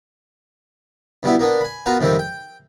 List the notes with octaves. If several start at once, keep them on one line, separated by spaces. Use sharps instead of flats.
G2 B2 G3 B3 E4
A#3 B3 D4
G#5 B5
B3 F4 F#4 A#4 B4
F2 G#2 C3 D#3 G3 C4
G5